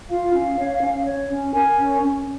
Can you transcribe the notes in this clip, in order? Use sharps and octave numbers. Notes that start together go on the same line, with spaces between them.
F4 F5
C#4
C#5
C#4
C#5
C#4
A#4 G#5
C#4
C#4